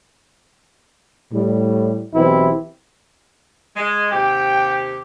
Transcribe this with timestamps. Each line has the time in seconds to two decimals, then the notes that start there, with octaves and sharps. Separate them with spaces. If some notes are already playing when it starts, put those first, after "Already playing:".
1.33 A2 G3
2.14 B1 E3 C4 E4 F#4 G4
3.76 G#3
4.12 D#2 C3 G4 G5